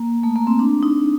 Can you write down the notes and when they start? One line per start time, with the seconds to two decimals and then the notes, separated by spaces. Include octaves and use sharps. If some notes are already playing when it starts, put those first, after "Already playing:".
Already playing: A#3
0.23 A3
0.36 A#3
0.47 C4
0.59 D4
0.83 D#4